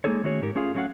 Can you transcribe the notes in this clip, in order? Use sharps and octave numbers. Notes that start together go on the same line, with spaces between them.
G#3 A#3 D#4 G#4 A4 C#5
D#3 A3 C#4 F#4 G#4 C#5
G#2 D#4 G4 A#4
A3 C#4 F4 G#4 F5
F#3 A3 C#4 F#4 F5 F#5